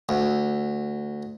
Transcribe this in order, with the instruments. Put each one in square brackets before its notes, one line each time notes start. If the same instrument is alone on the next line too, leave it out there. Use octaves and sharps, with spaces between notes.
[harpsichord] D2